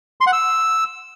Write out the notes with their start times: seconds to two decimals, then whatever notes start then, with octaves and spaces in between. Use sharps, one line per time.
0.21 C6
0.27 F#5
0.33 E6